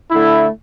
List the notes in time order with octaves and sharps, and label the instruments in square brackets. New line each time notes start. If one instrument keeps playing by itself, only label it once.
[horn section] D3 A3 E4